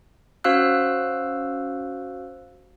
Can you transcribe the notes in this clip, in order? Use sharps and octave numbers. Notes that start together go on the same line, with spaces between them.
C#4 F#4 C5 F5 E6 F#6